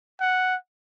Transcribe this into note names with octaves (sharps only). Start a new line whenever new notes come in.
F#5